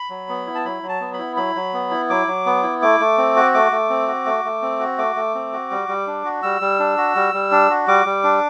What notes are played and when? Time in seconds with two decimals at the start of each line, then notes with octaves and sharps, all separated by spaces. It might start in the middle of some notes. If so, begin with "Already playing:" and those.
Already playing: B5
0.10 F#3
0.29 B3
0.46 E4
0.55 A5
0.65 F#3 B5
0.83 F#3
0.89 A5
1.00 B3
1.13 B5
1.18 E4
1.36 F#3 B5
1.55 F#3
1.73 B3
1.91 E4
2.10 F#3 D6
2.27 F#3
2.46 B3
2.63 E4
2.82 A3 D6
3.00 A3
3.18 C4
3.36 F#4
3.54 A3 D6
3.72 A3
3.89 C4
4.07 F#4
4.26 A3
4.45 A3
4.62 C4
4.80 F#4
4.98 A3 D6
5.16 A3
5.35 C4
5.53 F#4
5.71 G3
5.89 G3
6.07 D4
6.24 F#4
6.43 G3 E6
6.61 G3
6.79 D4
6.97 F#4
7.16 G3
7.34 G3
7.51 D4
7.70 F#4
7.87 G3 D6
8.06 G3
8.23 D4